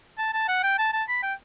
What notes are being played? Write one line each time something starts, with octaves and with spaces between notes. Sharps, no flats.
A5
A5
F#5
G5
A5
A5
B5
G5